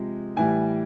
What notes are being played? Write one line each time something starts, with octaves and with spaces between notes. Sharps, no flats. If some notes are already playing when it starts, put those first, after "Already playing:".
Already playing: C3 F3 G#3
A2 E3 G3 G#5